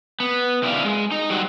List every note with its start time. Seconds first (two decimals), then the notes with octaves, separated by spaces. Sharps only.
0.20 B3
0.62 C3 D#3 E4 D5 F5
0.85 G#3
1.11 D#4
1.30 F#3 G3 F#4 C5 F#5